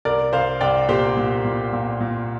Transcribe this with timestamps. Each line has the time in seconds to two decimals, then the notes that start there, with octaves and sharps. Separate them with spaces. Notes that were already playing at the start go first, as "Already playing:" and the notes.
0.05 C2 A#4 D5
0.33 C2 C5 F5
0.61 C2 D5 G5
0.89 A#2 G4 C5
1.17 A#2
1.45 A#2
1.73 A#2
2.00 A#2